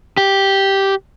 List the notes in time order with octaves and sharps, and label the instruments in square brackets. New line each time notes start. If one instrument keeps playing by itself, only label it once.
[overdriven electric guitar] G4